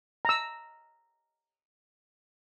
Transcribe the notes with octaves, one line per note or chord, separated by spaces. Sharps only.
A#5 E6